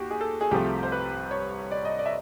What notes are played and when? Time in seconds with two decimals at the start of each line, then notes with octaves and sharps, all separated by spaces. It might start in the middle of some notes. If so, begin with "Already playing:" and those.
Already playing: D#2 F#4 G4
0.11 G#4
0.21 A4
0.41 G#4
0.51 C2 C3 F3 A3 G4
0.83 C5
0.92 B4
1.31 C#5
1.71 D5
1.85 D#5
1.99 D5
2.06 E5